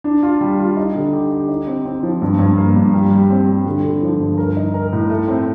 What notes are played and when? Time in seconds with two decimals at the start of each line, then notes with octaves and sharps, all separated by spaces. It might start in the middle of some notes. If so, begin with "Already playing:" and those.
0.04 D4
0.23 F4
0.41 G3
0.59 F4
0.77 D#4
0.95 D3
1.13 G4
1.31 G4
1.49 D#4
1.67 C4
1.85 C4
2.03 F3
2.22 G2
2.39 G2
2.57 A#3
2.76 G2
2.94 G3
3.12 G3
3.30 C4
3.47 G3
3.66 D3
3.84 D3
4.02 F3
4.20 G2
4.38 A#4
4.57 D#4
4.74 A#4
4.92 A2
5.10 A3
5.28 C4